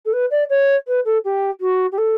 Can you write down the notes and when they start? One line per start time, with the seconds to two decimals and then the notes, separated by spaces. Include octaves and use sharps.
0.05 A4
0.13 B4
0.31 D5
0.50 C#5
0.87 B4
1.05 A4
1.25 G4
1.61 F#4
1.92 G4
1.98 A4